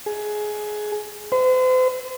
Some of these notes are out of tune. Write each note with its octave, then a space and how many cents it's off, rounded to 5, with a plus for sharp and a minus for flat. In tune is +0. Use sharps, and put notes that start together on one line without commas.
G#4 +20
C5 -40